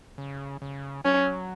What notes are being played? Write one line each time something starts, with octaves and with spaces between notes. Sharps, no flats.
C#3
C#3
F#3 C#4